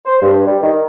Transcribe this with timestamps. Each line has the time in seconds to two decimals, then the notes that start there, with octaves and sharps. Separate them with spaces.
0.06 C5
0.22 G2
0.47 G3
0.62 D#3